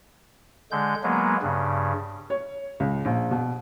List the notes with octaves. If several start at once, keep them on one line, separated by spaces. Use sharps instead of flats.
D3 G#3 G6
F#3 G#3 A#3 B3
G2 C#3
C#5
C#2
A#1
B2